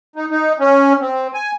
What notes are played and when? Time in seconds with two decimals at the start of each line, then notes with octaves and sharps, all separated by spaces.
0.16 D#4
0.31 D#4
0.60 C#4
1.01 C4
1.34 G#5